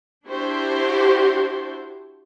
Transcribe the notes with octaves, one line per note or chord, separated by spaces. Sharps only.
D4 E4 F#4 G4 C5